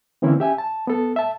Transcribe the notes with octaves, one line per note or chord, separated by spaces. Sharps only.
D3 E3 A#3 C4 C#4 E4
C#4 G4 E5 G#5
A5
B3 A4
E5 A5